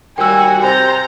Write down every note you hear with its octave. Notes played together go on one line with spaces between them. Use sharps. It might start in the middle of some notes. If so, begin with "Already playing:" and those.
D#2 G3 F#4 G5 G#5 E6
C3 C5 A#5